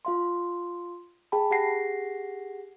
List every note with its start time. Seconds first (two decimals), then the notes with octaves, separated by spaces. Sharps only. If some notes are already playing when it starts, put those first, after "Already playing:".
0.05 F4 F5 C6
1.32 G#4 G5 A5 B5
1.50 G4 G#4 F#5 A#6 C7